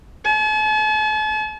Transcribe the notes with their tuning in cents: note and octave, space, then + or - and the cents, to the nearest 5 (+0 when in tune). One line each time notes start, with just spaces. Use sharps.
A5 -45